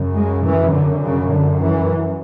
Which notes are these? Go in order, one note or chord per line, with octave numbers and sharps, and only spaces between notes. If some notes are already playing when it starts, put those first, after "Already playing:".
Already playing: F#2 C#3
G#3
E3
D3
C#3
D3
E3